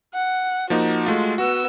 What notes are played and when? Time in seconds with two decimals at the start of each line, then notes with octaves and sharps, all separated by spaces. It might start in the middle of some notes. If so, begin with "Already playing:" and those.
0.14 F#5
0.70 F3 A#3 D#4 F#4
1.06 G#3 A3 F4
1.38 B3 F#4 E6